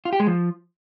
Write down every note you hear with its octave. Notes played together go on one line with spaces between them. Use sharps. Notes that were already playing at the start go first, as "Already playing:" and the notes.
F4
G4
G#3
F3